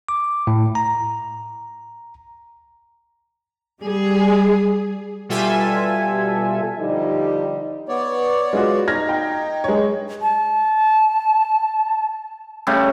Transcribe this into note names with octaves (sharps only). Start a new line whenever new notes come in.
D6
A2
A#5
G3 G#4
B2 G3 F4 A4 E5 G#5
D3 F3 G3 D#4 G4 D#5
B3 C#5 D5
G#3 F4 F#4
D#4 F6 G#6 A#6
G5
G#3 C#5
A5
C#3 G3 A3